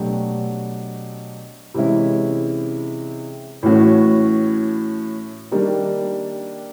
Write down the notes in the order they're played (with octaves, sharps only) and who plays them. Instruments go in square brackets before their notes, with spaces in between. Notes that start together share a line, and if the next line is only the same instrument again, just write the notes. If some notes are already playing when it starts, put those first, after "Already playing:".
Already playing: [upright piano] B2 F#3 A3 D4 G4
C3 E3 G#3 C#4 E4
A2 E3 A3 C#4 F#4
D#3 G3 A#3 D4